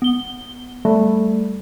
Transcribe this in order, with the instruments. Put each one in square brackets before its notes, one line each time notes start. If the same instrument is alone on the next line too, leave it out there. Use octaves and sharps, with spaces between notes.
[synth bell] B3 G7
[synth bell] G3 [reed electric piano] A3